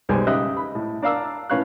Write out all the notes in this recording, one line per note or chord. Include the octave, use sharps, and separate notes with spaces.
B1 G3 G#3 G4 C5 G#5
C#3 D#4 G4 D#5 E5 F#6
B5
A2
D4 D5 F5 A#5 E6
A2 C#4 B4 C#5 F5 F#6